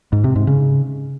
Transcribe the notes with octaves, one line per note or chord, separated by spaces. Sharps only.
G#2
C3
G#2
C#3